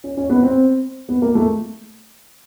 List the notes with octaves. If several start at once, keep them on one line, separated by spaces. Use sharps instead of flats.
C#4
C#4
B3
C4
B3
A#3
A3